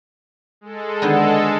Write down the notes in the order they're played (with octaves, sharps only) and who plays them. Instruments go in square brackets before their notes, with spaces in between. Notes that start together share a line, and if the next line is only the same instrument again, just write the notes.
[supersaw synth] G#3 A4
[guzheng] D3 D#3 B3